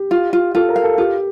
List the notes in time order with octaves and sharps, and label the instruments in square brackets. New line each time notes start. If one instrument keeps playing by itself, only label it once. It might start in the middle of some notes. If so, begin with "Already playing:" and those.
Already playing: [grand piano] G4
[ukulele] F4
F4
[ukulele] F4 [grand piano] A4
[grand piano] A#4
[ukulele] F5
[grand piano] A4
[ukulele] F4 [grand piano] G4